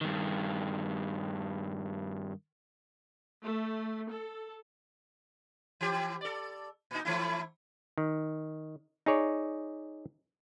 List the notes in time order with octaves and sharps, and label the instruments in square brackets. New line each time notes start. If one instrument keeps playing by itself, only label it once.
[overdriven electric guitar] G2 D#3
[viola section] A3
A4
[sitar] E3 G4
A4 D5
A#2 D#4
E3 A3 E4
[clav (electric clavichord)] D#3
D#4 G#4 C#5 D5